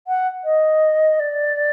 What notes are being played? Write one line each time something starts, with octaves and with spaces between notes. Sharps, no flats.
F#5
D#5
D5